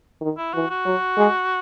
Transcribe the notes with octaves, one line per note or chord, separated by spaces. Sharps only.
D#3
E4
E3 F#4
F#4
F#3
G#3